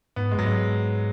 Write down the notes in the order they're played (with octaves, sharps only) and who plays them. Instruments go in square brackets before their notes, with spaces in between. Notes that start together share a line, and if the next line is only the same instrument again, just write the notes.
[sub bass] G#2 [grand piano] B3
[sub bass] F#2 [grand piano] G#3
[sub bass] G#2 [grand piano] F#3
[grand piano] G#3